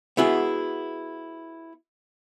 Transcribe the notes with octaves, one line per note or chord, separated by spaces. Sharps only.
B3 E4 F#4 G#4